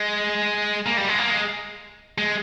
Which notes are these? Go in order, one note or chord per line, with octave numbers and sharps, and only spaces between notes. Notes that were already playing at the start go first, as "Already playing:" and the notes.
Already playing: G#3
A#3
G3
G#3
A#3
G#3
G#3